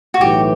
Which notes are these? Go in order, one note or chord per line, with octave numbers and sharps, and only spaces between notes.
F#4
B1 A2 E3 G4